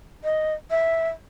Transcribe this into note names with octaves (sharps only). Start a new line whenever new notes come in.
D#5
E5